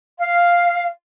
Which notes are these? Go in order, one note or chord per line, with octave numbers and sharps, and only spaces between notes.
F5